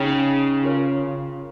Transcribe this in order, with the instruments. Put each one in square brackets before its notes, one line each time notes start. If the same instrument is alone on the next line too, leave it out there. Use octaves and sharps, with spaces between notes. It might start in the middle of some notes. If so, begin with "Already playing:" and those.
Already playing: [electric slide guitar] C#3 [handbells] D#4 G#4 C#5 G5
[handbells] F4 A#4 C#5